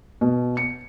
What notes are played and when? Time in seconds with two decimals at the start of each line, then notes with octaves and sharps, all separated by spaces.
0.21 B2
0.57 C#7